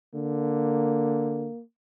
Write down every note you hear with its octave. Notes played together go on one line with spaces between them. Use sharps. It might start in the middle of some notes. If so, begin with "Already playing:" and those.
D3 A#3